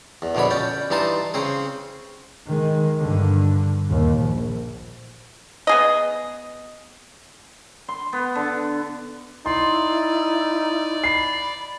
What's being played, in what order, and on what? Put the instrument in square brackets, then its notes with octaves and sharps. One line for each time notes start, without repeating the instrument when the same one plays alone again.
[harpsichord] E2
A#1 B2 D3 C#5 B5
C#4 D5 G5
G2 E3 D#4 A5 C6 D#6
C#3 C4 G#4
[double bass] D#3 G#3
G2 D3
D#2 A#2
A#1
[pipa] B3 G#4 D#5
[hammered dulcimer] C6
B3
D3
[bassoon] D#4 [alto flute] E4 [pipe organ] D5 [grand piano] C6
[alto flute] B5 [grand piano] C7